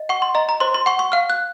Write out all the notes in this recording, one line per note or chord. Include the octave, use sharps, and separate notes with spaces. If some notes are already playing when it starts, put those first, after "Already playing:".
Already playing: D#5
F#5 C#6
C6
D#5 A#5
A#5
C5 C6
C6
F#5 C#6
C#6
F5 F6
F#6